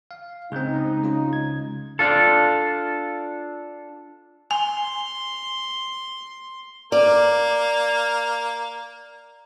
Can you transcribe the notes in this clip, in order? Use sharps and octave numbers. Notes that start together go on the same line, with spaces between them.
F5
C#2 C4 D#4 G#4
G#3 C#4 F4
G#6
D4 F4 A4
G#5 C6
A#3 D5